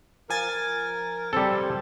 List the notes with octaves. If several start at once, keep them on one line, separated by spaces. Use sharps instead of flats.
F3 A#4 G#5 A6
G3 C4 A4